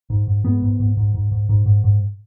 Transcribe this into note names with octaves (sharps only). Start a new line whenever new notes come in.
G#2
G#2
G#2 B3
G#2
G#2
G#2
G#2
G#2
G#2
G#2
G#2